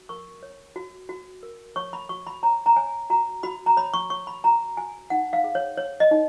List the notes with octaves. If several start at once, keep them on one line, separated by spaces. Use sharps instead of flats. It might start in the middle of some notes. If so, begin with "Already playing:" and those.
Already playing: F#4
A#4 C#6
C#5
F#4
F#4
A#4
C#5 C#6
B5
F#4 C#6
B5
C#5 A#5
A#5
C#5 G#5
F#4 A#5
F#4 B5
A#5
C#5 B5
C#6
C#5 C#6
B5
F#4 A#5
F#4 G#5
D#4 F#5
F5
G#4
C#5
C#5
D#5
D#4